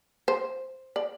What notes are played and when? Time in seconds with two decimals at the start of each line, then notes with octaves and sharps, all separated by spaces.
0.28 C5
0.96 D5